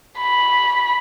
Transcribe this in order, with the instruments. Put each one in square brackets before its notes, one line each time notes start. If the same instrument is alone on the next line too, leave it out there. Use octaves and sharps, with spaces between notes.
[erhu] B5